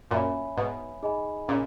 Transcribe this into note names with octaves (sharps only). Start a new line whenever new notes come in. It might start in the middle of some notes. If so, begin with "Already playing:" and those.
F#2 A#2 C#5 E5 G#5 B5
G#2 B2
D#4 G#4 D#5 G#5 B5
A#2 C#3